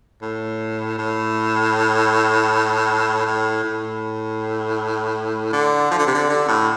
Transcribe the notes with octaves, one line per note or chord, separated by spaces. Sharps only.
A2
A2
A2
A2
D3
F3
D3
C3
D3
D3
A2